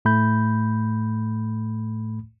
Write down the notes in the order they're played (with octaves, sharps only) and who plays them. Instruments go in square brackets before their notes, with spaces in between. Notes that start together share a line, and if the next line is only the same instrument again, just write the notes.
[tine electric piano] A2 A3 B5 G6